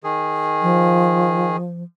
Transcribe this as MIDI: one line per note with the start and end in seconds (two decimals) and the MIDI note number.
0.04 1.57 51
0.04 1.57 68
0.62 1.83 53